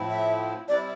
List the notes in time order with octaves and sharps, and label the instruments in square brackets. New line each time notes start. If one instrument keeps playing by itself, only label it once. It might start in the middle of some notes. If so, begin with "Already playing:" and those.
Already playing: [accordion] A2 F3 C4 E4
[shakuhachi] E5
[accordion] C3 G3 C4 E4 [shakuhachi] D5